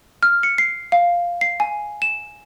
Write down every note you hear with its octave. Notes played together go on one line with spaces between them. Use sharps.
F6
C#7
C7
F5
C7
G#5
E7